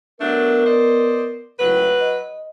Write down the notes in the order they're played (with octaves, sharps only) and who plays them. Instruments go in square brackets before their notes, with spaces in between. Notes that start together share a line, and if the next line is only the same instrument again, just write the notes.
[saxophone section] F#3 A3 D4 [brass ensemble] B3 A#4
[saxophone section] C5 D5 D#5
[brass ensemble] F#1 C#2 A2 [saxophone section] F#3 B4
[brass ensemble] D#5